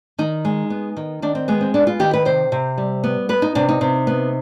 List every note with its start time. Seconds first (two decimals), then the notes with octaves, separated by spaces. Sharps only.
0.18 D#3 D#4
0.45 G#3
0.70 B3
0.97 D#3
1.22 D#3 D4
1.35 C4
1.48 G#3 B3
1.61 C4
1.74 B3 D4
1.87 F4
2.00 D#3 G4
2.13 B4
2.25 C3 C5
2.52 C3
2.78 G3
3.04 B3
3.29 B3 B4
3.42 D#4
3.55 C3 D4
3.69 D#4
3.81 C3
4.07 B3